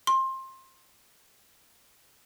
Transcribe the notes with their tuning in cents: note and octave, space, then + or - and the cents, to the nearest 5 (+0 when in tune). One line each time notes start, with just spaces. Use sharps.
C6 +20